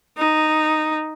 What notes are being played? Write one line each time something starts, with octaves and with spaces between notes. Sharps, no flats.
D#4